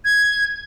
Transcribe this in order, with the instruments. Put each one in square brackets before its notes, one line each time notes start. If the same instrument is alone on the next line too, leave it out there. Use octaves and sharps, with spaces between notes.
[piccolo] G#6